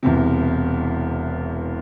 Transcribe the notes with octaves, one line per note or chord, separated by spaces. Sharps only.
E1 E2 C3